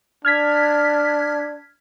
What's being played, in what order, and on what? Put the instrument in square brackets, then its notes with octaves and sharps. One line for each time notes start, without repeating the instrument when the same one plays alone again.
[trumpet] D4 [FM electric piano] F6 G#6 B6